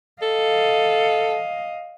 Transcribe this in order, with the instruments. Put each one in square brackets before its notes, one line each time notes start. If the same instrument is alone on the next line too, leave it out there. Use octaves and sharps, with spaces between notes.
[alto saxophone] A4 [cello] D#5 F5